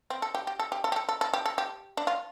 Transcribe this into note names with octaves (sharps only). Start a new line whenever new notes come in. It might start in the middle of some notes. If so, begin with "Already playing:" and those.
C4
A4
G4
G4
A4
G4
A4
G4
A4
A4
A4
G4
A4
G4
D4
F4